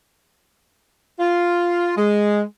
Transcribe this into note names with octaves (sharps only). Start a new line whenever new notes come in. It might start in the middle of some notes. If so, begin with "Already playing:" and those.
F4
G#3